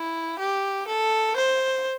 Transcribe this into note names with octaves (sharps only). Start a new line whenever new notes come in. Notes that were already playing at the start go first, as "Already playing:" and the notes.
Already playing: E4
G4
A4
C5